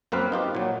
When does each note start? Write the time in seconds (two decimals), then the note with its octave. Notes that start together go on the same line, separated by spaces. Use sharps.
0.12 F#2 A#3 C4 B4 F5
0.32 D#4 F4 G4
0.55 A#2 F#3